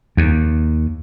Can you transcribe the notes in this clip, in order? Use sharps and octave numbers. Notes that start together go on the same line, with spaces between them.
D#2